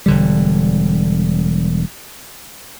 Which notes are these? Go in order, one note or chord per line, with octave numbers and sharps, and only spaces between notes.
E1 D3 G3